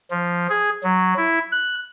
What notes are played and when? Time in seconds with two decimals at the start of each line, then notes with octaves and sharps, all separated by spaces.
0.11 F3
0.50 G#4
0.83 F#3
1.17 E4
1.51 F#6